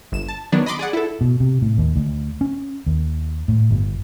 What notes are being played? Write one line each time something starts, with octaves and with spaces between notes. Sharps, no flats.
G1 E7
A5
D#3 F#3 B3 D4
D#5 B5 C6 D6
G#4 D5 F#5
E4 A4
B2
C3
A2
D#2
D2
C#4
D#2
A2
G1